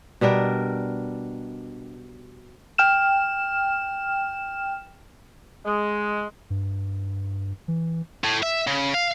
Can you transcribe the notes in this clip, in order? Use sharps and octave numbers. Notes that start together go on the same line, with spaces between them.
B2 G3 D4 A#4
G5 F6 E7
G#3
G2
E3
A2
E5
C#3
F5